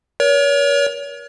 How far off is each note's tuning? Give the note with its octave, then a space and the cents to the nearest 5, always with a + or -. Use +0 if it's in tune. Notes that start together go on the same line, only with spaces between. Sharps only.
A#4 +40 C#5 +35